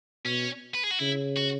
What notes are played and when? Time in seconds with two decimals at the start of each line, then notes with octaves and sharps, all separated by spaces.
0.25 B2 C#4
0.75 B4
0.84 G#4
0.91 F#4
1.00 C#3 E4
1.37 F#4